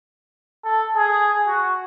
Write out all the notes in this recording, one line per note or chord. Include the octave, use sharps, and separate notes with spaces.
A4
G#4
F#4